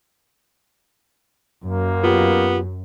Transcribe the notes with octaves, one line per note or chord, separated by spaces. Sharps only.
F#2 A#3
B3 F4 G4